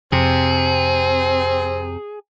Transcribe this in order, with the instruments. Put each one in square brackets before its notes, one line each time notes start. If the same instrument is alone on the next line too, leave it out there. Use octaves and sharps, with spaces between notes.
[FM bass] F2 [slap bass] C3 [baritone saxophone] C4 [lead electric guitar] G#4